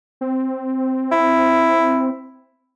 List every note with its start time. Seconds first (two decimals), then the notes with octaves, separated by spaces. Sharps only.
0.21 C4
1.11 E4